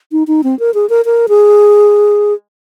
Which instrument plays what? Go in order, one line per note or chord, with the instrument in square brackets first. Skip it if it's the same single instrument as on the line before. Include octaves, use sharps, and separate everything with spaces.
[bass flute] D#4
D#4
C4
A#4
G#4
A#4
A#4
G#4